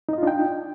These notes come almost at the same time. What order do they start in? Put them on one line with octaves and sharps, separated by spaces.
D#4 D#5 F4 D4 G5